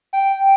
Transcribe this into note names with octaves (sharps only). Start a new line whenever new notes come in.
G5